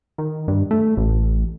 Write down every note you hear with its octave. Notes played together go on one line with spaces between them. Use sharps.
D#3
G2
A3
A1